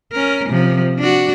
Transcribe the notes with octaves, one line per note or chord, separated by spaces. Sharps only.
C#4 A#4
C3 F3
D4 F#4